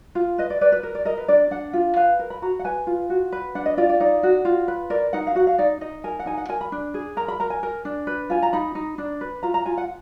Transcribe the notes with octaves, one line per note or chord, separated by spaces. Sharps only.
F4
B4 D#5
D5
B4 D5
B4
A#4
D5
A#4 D#5
B4
D4 D5
D4 F#5
F4
B4 F5
A#4
B5
F#4 A#5
F#5
B4 G#5
F4
F#4
B4
D4 F#5
D#5
F4 D5
D5
D#4 D5
F#4
F4
B4
A#4 D5
D#4 F#5
F5
F#4 F#5
F5
D#4 D5
D#4 D#5
A#4 G#5
F#5
D#4 G#5
F#5
A#4 G#5
B5
D4
G#4
A#4 A#5
B5
A#4 A#5
G#5
A#4
D4
B4
F4 G#5
A#5
D#4 B5
D#4
D4
B4
F4 A#5
A#5
F4 G#5
F#5